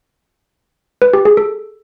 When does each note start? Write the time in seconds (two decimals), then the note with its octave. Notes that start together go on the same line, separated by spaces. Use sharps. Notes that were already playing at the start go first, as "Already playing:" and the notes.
1.02 B4
1.13 G4
1.25 G#4
1.37 A4